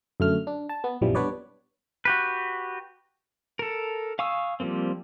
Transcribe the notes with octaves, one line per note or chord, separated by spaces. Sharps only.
F#2 D3 A3 F6
D4
A5
B3
A#1 F#2 B2 E3 F3 G3
G3 B3 D4 B4 C#5 D5
F#4 G4 B4
A4 A#4
F5 G#5 C#6 D#6 E6
F3 G3 A3 A#3 C4